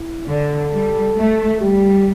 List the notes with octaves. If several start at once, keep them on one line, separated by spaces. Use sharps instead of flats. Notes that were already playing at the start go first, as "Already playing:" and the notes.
Already playing: E4
D3 A4
G3
A3
G3 G4